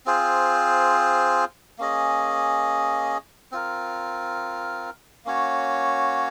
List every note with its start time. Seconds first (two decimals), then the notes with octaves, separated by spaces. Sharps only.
0.06 C4 F4 G#4 C5
1.78 A#3 C#4 G#4 D#5
3.52 C4 F4 A#4
5.25 A#3 C#4 F#4 C#5